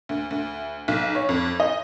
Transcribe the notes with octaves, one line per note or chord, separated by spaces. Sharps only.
D2
D2
B1
C#5
F2
D#5